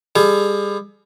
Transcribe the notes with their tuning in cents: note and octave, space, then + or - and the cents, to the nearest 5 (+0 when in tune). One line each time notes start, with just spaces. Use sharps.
G3 +35 G#4 +35